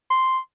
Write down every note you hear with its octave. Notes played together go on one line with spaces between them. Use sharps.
C6